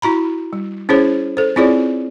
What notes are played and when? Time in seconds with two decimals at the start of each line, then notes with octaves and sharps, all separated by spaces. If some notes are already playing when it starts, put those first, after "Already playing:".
0.02 E4 F#4 A#5 B5
0.53 G3
0.89 C#4 E4 G#4 C5 C#5
1.37 A4 C5
1.56 C4 E4 F4 G#4 C#5 D5